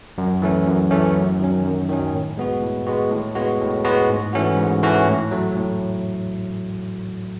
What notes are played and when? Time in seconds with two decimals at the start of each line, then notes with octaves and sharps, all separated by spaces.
0.18 F#2
0.42 E3 A3 C#4
0.67 F#2
0.91 E3 A3 C#4
1.15 F#2
1.39 D#3 F#3 C#4
1.64 F#2
1.89 D#3 F#3 C#4
2.13 A2
2.38 G#3 B3 F#4
2.62 A2
2.87 G#3 B3 F#4
3.12 A2
3.35 G#3 B3 F#4
3.61 A2
3.84 G#3 B3 F#4
4.09 G#2
4.33 E3 A3 C#4 F#4
4.58 G#2
4.83 E3 A3 C#4 F#4
5.07 A2
5.31 F#3 A3
5.56 A2